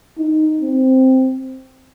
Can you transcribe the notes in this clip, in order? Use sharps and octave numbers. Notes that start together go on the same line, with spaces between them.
D#4
C4